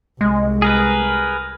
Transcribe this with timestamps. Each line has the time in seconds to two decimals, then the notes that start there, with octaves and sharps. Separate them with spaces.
0.21 C2 G#3
0.62 G#4 A#4 B4